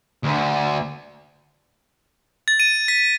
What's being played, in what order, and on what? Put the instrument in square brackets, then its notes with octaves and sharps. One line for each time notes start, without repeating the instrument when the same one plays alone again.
[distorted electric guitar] D2
[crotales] A6
D#7
B6